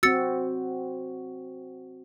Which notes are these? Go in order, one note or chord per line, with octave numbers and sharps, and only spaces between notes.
C4 F#4 E6 A6 C#7